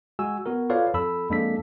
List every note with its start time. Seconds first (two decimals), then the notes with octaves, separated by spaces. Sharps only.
0.19 G#3 F#4 G#5 E6
0.46 B3 F#4 A#4
0.70 F4 A4 B4 C#5 D5 F5
0.94 F2 A4 B5 E6
1.29 F2 G#3 A#3 D4 A4 B6